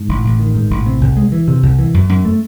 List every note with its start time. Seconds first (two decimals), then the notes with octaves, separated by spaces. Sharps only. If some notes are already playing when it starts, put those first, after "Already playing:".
Already playing: G#2
0.09 A1
0.24 A1
0.39 D#3
0.55 G#2
0.70 A1
0.86 C3
1.01 C2
1.17 G#3
1.32 E3
1.48 C3
1.63 C2
1.79 E3
1.94 F#2
2.09 F#2
2.25 A3